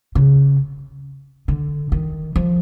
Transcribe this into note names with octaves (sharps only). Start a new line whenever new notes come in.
C#3
D3
D#3
F3